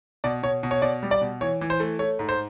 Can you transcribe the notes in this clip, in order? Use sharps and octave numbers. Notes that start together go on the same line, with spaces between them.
B2 D5
B2 C#5
B2
C#5
B2 D5
G3
D5
B2
E3 C#5
E3
C5
A3
A3 C#5
G#2
C5